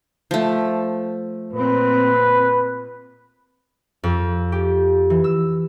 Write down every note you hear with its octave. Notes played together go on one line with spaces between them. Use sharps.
F3 A3
A#2 C4 B4
F2
G4
E3
E6